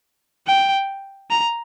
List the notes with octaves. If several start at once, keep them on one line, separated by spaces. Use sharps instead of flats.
G5
A#5